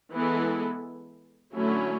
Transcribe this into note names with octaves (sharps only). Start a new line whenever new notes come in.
E3 G#3 B3 E4 A4
D3 F#3 A3 C#4 E4